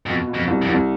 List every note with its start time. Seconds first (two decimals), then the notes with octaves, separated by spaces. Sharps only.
0.06 F2 B2
0.27 B2
0.34 F2
0.47 C2
0.62 F2
0.69 C2